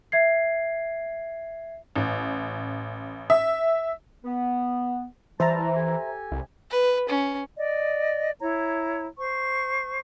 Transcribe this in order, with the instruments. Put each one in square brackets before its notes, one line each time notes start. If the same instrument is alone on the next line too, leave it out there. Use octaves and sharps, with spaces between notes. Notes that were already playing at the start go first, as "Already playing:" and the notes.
[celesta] E5 G#6 C7
[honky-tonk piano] A1
E5
[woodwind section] B3
[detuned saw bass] E3 [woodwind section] G3 A5 [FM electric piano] C5 E5 A#5
[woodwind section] G4 A4 G#5
[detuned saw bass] C2
[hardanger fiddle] B4
C#4
[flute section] D5 D#5
E4 C#5 A#5
C5 C#6